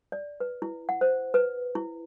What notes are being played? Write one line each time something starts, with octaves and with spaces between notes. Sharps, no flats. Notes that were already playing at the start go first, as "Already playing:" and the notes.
D5
B4
E4
F#5
C5
B4
E4